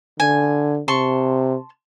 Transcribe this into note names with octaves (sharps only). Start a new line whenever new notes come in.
D3 G#5
C3 A5 C6 C#6